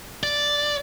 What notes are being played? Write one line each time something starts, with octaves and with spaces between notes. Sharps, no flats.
D5